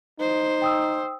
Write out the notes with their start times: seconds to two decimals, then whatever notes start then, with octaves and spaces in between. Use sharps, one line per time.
0.20 D#4 C5
0.62 G5 D#6 E6